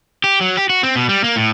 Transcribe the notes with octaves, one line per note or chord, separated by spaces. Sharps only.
G4
F#3
G4
F#4
C4
B2
G3
A#3
A2